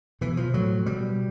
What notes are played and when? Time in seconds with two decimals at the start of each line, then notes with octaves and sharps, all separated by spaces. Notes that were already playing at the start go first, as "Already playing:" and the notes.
0.21 B2 E3
0.37 F3
0.54 A2 F#3
0.86 B2 G3